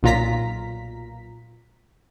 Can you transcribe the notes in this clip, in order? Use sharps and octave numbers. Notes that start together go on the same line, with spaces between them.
B1 A#2 F4 A#5 B6